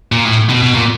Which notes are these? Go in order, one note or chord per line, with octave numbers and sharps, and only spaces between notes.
A#2
A2
B2
B2
A#2